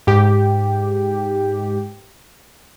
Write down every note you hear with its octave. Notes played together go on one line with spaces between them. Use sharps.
G#2 G4